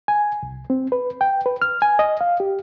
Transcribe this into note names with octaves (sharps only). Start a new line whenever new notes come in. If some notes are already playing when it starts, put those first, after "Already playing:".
G#5
C2
C4
B4
G5
B4
F6
G#5
D#5
F5
G4